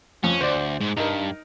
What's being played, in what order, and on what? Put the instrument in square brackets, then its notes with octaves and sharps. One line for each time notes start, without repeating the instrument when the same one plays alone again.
[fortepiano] F2 [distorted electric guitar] C#4
[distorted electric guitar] D2 [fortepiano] C5 D5
[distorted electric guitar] G#2
[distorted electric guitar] G2 [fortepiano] D#4 A#4